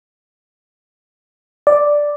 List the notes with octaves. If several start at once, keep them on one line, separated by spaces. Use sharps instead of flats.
D5